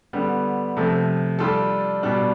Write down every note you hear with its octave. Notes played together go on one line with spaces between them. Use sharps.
D3 G3 B3
C3 F3 A3
G3 D4 F4 A4
B2 G3 D4